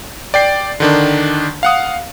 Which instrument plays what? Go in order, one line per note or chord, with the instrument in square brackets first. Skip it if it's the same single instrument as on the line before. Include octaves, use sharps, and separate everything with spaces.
[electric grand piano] D5 G5 C7
D3 D#3 D4
F5 F#5 D#6